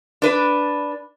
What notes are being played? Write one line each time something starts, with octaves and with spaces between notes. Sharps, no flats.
D4 B4